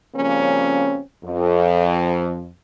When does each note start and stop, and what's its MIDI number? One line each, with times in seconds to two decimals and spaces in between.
0.15 0.99 49
0.15 0.99 53
0.15 0.99 55
0.15 0.99 58
0.15 0.99 60
0.15 0.99 61
1.23 2.48 41